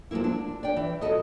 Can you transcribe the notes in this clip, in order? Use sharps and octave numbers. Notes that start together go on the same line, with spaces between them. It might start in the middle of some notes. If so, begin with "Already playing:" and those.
F3 F#3 G#3 A#3 E4
D4
D5 G5
E3
F2 D#3 F#4 A4 D#5